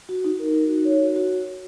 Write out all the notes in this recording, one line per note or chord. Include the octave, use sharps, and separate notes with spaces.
F#4
D#4
A#4
D#4
F#4
C#5
F#4
F#4